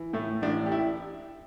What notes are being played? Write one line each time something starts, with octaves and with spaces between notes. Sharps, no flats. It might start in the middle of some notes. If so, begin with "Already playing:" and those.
Already playing: E3
A2 A3
A1 D4
G4
E4